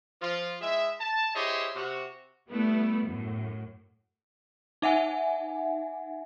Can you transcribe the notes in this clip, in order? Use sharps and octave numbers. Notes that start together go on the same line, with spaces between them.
F3 F4
G#3 E4 G#4 E5
A5
E4 G4 G#4 C5 C#5 D#5
C3 F#4
G3 A3 B3 E4
F#2 A2
D#4 E5 F#5 G#5